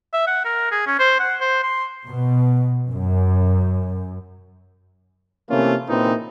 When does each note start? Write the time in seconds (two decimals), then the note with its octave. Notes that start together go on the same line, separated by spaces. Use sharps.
0.13 E5
0.27 F#5
0.45 A#4
0.71 G#4
0.87 C#4
0.99 C5
1.20 F#5
1.41 C5
1.63 C6
2.08 B2
2.90 F#2
5.49 C3 E3 A3 A#3 C#4 F4
5.88 A#2 C#3 E3 C4 D#4